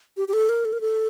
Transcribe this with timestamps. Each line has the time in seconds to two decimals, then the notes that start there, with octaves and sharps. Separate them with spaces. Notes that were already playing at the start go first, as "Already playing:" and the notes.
0.17 G4
0.28 G4
0.33 A4
0.49 A#4
0.65 A4
0.73 A#4
0.81 A4